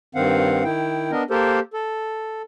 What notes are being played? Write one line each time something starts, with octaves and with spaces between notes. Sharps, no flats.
G2 D#3 C4 F5 F#5
D#3 E4 G5
B3 D4 A#4 D#5
A#3 G4 A4 A#4 C5
A4